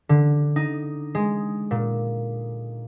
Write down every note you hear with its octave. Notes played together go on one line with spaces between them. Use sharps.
D3
D#4
G#3
A#2